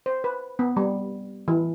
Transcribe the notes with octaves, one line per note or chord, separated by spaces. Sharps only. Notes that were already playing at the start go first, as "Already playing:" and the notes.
C5
B4
B3
G3
E3